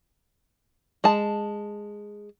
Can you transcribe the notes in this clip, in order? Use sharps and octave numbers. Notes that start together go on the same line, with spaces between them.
G#3 A5